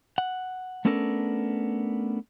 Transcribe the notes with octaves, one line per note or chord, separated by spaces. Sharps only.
F#5
A3 B3 C#4 D4 A4 A#4